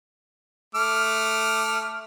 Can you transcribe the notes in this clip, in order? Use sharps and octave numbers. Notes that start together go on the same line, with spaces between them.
A3 D6 F6